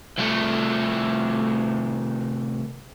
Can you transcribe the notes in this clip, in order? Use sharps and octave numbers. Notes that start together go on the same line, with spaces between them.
C2 A3